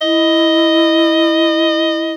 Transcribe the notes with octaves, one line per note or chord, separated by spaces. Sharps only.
E4 D#5